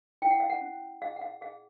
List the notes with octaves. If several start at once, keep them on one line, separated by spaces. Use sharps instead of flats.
E4 G5
F#5
F5
F#5
C#4
G#4 F5
F#5
F5
G#4 F5